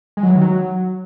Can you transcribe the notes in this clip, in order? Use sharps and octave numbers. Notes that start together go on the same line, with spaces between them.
G#3
F#3
E3
D#3
F#3